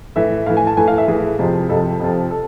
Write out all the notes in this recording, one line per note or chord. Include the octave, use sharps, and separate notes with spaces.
A2 E3 E5
A2 E3 F5
G#5
A5
A2 E3 G#5
F5
E5
A2 E3 G#4
F2 C3 F3
F2 C3 F3 A4
F2 C3 F3
A4